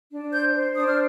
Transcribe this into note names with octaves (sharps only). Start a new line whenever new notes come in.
D4
C5 G6
C5
D4 D#6
F6